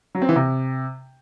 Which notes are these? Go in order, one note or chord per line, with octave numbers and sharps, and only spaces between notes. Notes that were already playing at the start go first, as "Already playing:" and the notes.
F#3
C4
E3
C3